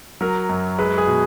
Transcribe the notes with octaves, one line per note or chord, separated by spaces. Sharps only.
F#3 A#4
F#2
G#3 B4
G#4
B2